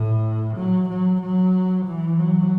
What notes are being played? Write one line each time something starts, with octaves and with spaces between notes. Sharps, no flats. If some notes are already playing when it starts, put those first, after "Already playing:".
Already playing: A2
F#3
F#3
F#3
E3
F#3